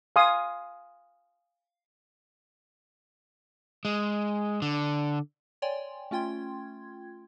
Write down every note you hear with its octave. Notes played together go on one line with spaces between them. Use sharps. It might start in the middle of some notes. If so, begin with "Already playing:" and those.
F5 G#5 C6 D#6
G#3
D3
C#5 D5 G5 G#5 C6
A3 C#4 F4 G5 C6 G#6